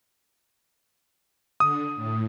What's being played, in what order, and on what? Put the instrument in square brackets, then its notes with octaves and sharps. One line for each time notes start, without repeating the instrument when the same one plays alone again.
[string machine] D3 [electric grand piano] D#6
[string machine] A2